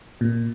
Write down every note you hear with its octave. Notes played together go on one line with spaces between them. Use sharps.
A#2